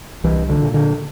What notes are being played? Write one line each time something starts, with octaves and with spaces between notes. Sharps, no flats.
C2 E3
D3
A#2
D3